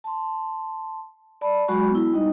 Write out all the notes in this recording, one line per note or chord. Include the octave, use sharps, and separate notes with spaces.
A5 C6
D5 A5 B5
F#3 G#3 F#4 B5 C#6
B3 E4
G3 D#4 D#5